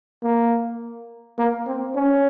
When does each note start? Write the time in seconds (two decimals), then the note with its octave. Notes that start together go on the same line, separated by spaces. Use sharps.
0.23 A#3
1.38 A#3
1.67 C4
1.95 C#4